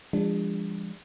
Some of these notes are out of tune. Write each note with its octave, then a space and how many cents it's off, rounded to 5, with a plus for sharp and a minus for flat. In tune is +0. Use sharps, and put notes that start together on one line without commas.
F3 -25 G#3 -40 D4 +0